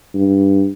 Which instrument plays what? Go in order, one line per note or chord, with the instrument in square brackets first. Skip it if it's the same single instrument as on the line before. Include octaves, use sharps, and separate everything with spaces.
[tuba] G2